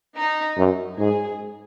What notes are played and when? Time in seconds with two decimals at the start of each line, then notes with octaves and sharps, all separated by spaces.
0.16 D#4
0.57 F#2
0.98 G#2 G#4